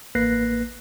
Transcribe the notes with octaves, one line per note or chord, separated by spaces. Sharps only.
A1 A#3 B4 F#6 A#6 C7